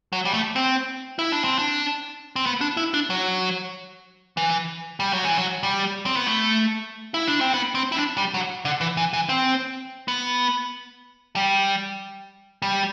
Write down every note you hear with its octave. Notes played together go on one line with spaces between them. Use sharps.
F#3
G3
A3
C4
E4
D4
C4
D4
C4
B3
D4
E4
D4
F#3
E3
G3
F#3
E3
F#3
G3
C4
B3
A3
E4
D4
C4
B3
C4
E4
D4
G3
F#3
D3
E3
E3
E3
C4
B3
G3
G3